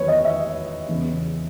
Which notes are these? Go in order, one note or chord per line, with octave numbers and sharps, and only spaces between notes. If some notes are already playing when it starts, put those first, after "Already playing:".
Already playing: E2 D#3 F#3 B3 B4 C#5
D#5
E5
E2 C#3 E3 B3